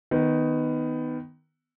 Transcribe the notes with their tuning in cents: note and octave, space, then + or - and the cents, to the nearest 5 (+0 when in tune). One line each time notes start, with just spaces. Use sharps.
D#3 +0 B3 +15